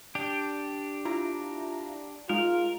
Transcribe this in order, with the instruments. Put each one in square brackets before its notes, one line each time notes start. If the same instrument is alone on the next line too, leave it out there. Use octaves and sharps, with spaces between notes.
[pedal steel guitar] D4 G4
[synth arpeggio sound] E4 F4 A#5
[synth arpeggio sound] G#3 D#4 [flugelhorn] F4 [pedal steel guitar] A#4